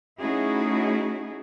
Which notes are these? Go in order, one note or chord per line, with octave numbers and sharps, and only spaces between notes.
A3 C#4 D#4 E4 F#4 G#4